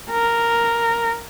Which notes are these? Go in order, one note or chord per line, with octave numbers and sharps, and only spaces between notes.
A#4